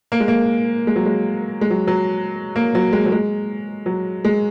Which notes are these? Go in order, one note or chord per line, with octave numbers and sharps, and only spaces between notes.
A#3
G#3
A#3
G#3
F#3
G#3
G#3
F#3
F#3
A#3
F#3
G#3
F#3
G#3
F#3
G#3